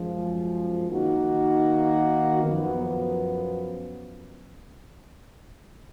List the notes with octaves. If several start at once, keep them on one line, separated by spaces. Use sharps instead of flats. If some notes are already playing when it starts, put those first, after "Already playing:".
Already playing: F#2 F3 G#3
D#3 A#3 D#4 F#4
F#2 F3 B3